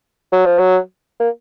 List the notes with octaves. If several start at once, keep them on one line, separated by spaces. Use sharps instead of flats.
F#3
F3
F#3
A#3